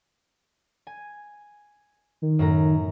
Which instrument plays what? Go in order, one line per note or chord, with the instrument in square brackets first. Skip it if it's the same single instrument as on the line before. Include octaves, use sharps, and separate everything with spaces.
[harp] G#5
[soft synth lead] D#3
[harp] F#2 A2 A#5